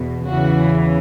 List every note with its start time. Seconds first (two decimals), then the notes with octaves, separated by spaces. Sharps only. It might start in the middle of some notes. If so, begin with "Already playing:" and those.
Already playing: E2 B2
0.28 E2 C#3 E3 F#4